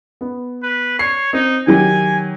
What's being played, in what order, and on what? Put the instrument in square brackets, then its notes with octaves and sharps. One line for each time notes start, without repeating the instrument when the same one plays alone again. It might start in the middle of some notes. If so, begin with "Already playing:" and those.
[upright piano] B3
[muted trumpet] B4
[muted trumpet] C#5 [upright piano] C7
[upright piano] C4 [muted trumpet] D#4
[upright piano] D#3 F#3 G4 [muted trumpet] G#5